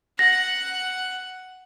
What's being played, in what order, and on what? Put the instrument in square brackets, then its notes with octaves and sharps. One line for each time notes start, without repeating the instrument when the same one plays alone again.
[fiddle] F#5 [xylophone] A#6